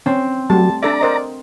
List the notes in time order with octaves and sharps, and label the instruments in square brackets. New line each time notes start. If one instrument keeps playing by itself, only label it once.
[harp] C4 [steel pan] C#4
[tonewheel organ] F#3 [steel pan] G3 A3 [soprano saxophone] A5
[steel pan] D4 A4 E5 [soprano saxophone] D5 [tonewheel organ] A#5
[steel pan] A#4 C5 D#5